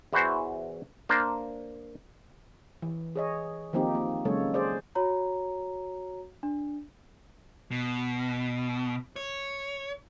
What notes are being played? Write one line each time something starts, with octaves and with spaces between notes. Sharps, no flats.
E2 E3 E4 F#4 C5
A#3 D4 C5
E3
G#4 C#5 D#5
D#3 F3 A#3 C4 D#4 G4
A#3
C#3 F#3 G#3 A#3 A4 C#5
G#4 C5 D5
F#4 C#5 A#5
D4
B2
C#5